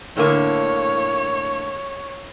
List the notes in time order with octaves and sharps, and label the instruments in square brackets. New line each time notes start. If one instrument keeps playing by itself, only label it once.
[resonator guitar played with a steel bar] A2 D3 A#3 [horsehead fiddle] C#5